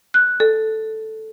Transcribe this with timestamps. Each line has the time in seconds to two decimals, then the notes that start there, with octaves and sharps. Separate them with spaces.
0.14 F#6
0.40 A4